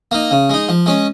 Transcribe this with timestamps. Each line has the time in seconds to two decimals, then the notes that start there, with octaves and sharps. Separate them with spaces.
0.11 A#3 D#4
0.31 C#3
0.50 G#3 D#4
0.69 F3
0.86 G#3 C#4